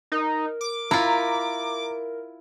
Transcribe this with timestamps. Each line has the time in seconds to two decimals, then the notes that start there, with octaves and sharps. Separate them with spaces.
0.12 D#4 A#4
0.61 D6
0.91 E4 F4 A#5